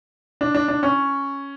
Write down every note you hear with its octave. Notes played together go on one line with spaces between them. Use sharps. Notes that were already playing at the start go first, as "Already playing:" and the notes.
D4
D4
D4
C#4